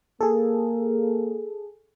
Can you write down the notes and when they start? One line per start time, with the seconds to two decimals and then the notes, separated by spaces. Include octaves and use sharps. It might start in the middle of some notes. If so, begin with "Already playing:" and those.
0.21 A#3 G#4 A4